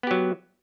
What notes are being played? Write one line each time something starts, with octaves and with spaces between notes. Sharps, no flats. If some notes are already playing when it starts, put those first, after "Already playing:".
F#3 B3 G4